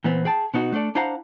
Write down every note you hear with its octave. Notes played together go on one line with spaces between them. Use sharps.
A#2 E3 B3 C4
G#4 G5 A5
B2 B3 D#4 F#4
A3 D4 A4 D5
D4 E4 C5 F5 F#5 A#5